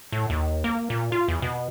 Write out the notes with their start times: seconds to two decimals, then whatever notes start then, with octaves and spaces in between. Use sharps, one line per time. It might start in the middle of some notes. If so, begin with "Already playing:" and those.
0.12 A2
0.30 D#2
0.64 A#3
0.90 A#2
1.12 F4
1.28 E2
1.42 B2